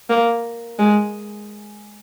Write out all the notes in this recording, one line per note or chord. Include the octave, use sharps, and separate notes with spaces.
A#3
G#3